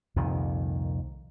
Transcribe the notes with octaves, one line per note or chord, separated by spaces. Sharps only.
C2 F2 A#2 D#3